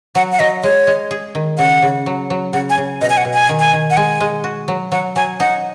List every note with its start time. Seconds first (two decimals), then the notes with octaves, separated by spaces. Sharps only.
0.15 F#3 F#5
0.32 F#5
0.39 F#3 D#5
0.63 G#3 C#5
0.87 G#3
1.11 G#4
1.35 D#3
1.58 C#3 F#5
1.82 C#3
2.06 F#3
2.30 F#3
2.53 C#3 F#5
2.70 G#5
2.78 C#3
3.01 B2 D#5
3.10 G#5
3.17 F#5
3.25 B2
3.34 G#5
3.49 D#3
3.59 G#5
3.73 D#3
3.90 F#5
3.97 G#3 G#5
4.20 G#3
4.44 F#4
4.68 F#3
4.92 F#3 F#5
5.16 F#3 G#5
5.40 D#4 F#5